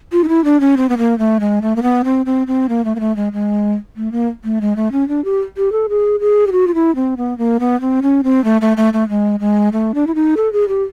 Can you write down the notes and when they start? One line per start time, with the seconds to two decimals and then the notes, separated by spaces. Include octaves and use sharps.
0.12 F4
0.24 D#4
0.28 E4
0.44 D4
0.60 C#4
0.77 C4
0.89 B3
0.98 A#3
1.19 A3
1.40 G#3
1.62 A3
1.76 A#3
1.83 B3
2.04 C4
2.26 C4
2.47 C4
2.69 A#3
2.85 A3
2.95 A#3
3.00 A3
3.16 G#3
3.33 G#3
3.96 A3
4.12 A#3
4.44 A3
4.61 G#3
4.76 A3
4.92 C#4
5.08 D4
5.24 G4
5.57 G4
5.72 A4
5.89 G#4
6.20 G#4
6.47 G4
6.52 F#4
6.67 F4
6.74 E4
6.95 C4
7.17 B3
7.38 A#3
7.60 B3
7.81 C4
8.02 C#4
8.24 C4
8.44 A3
8.61 A3
8.77 A3
8.93 A3
9.09 G#3
9.40 G#3
9.72 A3
9.94 D4
10.07 E4
10.15 D#4
10.37 A4
10.53 G#4
10.68 G4